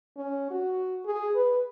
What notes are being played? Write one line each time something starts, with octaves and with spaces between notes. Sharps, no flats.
C#4
F#4
G#4
B4